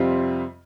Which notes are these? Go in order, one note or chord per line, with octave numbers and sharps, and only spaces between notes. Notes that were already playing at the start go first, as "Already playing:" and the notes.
Already playing: F2 C3 G3 C4 F4